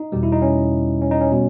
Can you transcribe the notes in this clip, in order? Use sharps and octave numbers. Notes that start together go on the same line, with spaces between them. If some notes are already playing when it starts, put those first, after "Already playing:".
Already playing: D#4
E2 B2 G3 G4
E4
D#4
C#4
C#4
D#4
C#4
B2 G3